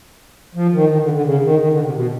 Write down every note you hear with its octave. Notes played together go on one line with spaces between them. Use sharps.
F3
D#3
D#3
D3
D3
C#3
D#3
D#3
D3
C3
B2